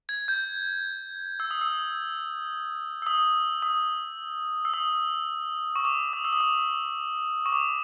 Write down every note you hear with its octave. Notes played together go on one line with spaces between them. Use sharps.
G#6
G6
E6
D#6
E6
E6
D#6
D#6
E6
D#6
C#6
D6
D#6
E6
D#6
D6
C#6
D6